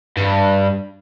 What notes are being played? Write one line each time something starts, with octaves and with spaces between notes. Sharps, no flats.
G2